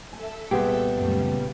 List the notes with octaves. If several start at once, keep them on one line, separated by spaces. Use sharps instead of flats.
A4 E5 G#5
C2 A#2 B3 G4 G#4 B4
F#2 C#3 G3 A3